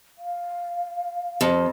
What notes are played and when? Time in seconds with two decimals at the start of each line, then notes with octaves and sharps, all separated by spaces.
0.18 F5
1.41 F2